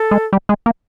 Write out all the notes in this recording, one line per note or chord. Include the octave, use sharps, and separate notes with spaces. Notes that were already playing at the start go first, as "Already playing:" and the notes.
Already playing: A4
G#3
G3
G#3
A#3